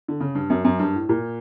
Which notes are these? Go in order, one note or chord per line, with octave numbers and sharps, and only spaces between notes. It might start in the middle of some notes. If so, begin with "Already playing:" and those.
D3
C#3
G2
F#2
F#2
G2
A2
A#2